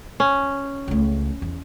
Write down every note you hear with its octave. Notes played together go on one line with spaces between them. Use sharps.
C#4
C#2 A3
E2